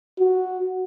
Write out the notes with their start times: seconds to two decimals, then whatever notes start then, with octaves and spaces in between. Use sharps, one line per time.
0.20 F#4